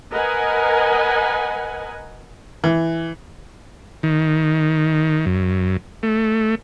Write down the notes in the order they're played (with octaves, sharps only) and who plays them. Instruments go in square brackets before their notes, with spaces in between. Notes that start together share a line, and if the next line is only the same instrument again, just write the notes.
[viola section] A#4 B4 D#5 F#5 G#5
[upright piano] E3
[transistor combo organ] D#3
F#2
A3